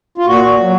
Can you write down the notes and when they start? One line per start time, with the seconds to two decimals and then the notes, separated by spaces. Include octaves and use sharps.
0.18 F4
0.26 A#2 F#4
0.60 F#3